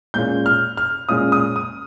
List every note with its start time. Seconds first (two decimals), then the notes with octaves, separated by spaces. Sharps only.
0.14 A#2 G#3 C#4 F4 G6
0.46 F6
0.77 F6
1.09 A#2 G#3 C#4 F4 D#6
1.32 D#6
1.56 D#6